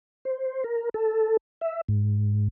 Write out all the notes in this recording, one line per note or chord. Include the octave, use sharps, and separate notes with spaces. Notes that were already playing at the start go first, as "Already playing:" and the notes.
C5
A#4
A4
E5
G#2